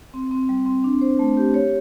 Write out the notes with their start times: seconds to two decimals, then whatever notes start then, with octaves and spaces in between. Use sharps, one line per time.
0.14 C4
0.31 C4
0.49 G3
0.66 C4
0.84 D4
1.01 C5
1.19 A3
1.37 G4
1.54 C#5